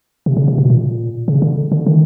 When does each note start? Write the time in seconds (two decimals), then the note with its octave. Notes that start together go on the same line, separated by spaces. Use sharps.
0.26 C3
0.37 C#3
0.48 C3
0.58 B2
0.70 A#2
1.28 C#3
1.42 D3
1.72 D3
1.87 D#3